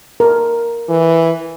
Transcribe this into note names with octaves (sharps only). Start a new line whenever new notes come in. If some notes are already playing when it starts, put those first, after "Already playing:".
A#4
E3